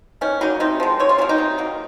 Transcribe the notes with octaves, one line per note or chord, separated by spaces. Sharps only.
D#3 C#4
F#3 A#3 D#4
C3 D#4
F3 G#3
C3 C#5
F4
F#3 A#3 C#4
D#4
C3
F#3 A#3